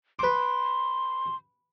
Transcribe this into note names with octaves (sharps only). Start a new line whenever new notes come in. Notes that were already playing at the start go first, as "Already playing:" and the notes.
B4 C6 D6